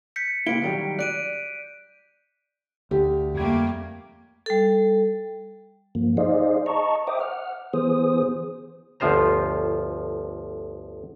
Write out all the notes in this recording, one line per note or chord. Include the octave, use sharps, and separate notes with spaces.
G6 B6 C#7
C3 A#3 E4 D7 G7
D#3 F#3 G3
D5 F#6 D7 D#7
D2 G4
F2 G3 A3 A#3 G#6
G3 A4
G2 F3 A#3
D#4 G#4 C5 D5 D#5 F5
D#5 A5 A#5 C#6
C5 D#5 E5 G5 D6 D#6
F#5 F6
E3 B3 G#4 C5 D#6
G1 D2 F3 F4 C5 A#5